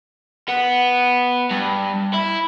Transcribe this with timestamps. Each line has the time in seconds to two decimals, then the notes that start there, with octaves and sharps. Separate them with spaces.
0.48 B3
1.51 G2
2.13 E4